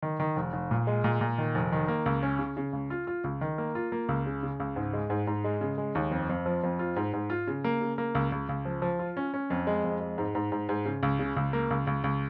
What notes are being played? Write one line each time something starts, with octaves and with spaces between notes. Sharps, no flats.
D#3
D#3
F1
F1
A#2
G#3
A#2
A#2
D#3
F1
D#3
A#3
C#2
C#4
C#3
C#3
C#2
F4
F4
C#2
D#3
A#3
F4
A#3
C#2
C#3
C#3
C#2
G#2
G#3
G#2
G#2
G#3
C#3
G#3
D#2
F2
F2
F3
F2
F4
G#2
G#2
F4
C#3
A#3
C#3
A#3
C#2
C#2
C#2
F3
F3
F4
C#4
C#4
F2
G#3
F2
G#3
G#2
G#2
G#2
G#2
C#3
C#2
C#3
C#2
A#3
C#2
C#2
C#2